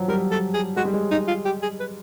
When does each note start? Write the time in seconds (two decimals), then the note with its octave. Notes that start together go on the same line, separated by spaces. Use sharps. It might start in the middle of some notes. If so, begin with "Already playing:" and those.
Already playing: F3 F#3
0.08 G3 A#4
0.31 A4
0.54 G#4
0.76 G#3 F#4
0.85 G3
0.93 G#3
1.11 D#4
1.28 F4
1.45 G4
1.62 G#4
1.80 B4